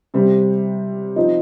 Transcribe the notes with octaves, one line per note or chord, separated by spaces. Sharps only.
C3 G3 C4
F3 C4 D#4